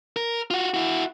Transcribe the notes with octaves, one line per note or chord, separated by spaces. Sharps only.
A#4
F4 F#4
E4 F#4